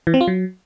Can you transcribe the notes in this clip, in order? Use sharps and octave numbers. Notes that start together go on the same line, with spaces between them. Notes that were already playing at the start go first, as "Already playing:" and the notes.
E3
C4
F4
F#3